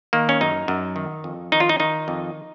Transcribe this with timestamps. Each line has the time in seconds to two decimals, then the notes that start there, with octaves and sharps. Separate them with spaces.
0.13 D#3 A#3
0.29 C#4
0.41 F#2 D#4
0.68 F#2
0.96 D#3
1.24 F2
1.52 D#3 D#4
1.60 F4
1.69 D#4
1.80 D#3 D#4
2.08 F2